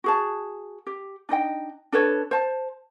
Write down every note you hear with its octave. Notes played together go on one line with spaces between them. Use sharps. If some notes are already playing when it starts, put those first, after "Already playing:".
F#4 G#4 A5
G4
D4 D#4 D#5 G5
D4 A4 B4 C#5
C5 A5